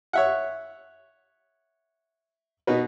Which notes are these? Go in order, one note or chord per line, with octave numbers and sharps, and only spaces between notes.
C#5 E5 F#5
B2 D#4 F#4 B4